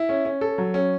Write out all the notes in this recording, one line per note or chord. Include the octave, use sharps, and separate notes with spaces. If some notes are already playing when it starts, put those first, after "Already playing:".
Already playing: E4
C#4
C#4
A4
F#3
C#4